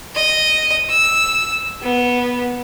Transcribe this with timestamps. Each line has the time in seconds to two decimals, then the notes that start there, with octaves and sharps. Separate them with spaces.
0.16 D#5
0.90 E6
1.83 B3